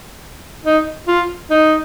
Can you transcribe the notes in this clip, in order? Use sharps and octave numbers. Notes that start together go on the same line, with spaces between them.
D#4
F4
D#4